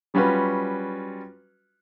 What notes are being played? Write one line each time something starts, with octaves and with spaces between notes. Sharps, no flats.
F#3 G3 C#4 F4 F#4 B4